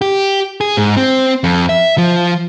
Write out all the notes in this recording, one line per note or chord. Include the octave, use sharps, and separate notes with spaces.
G4
G#4
G#2
C4
F2
E5
F3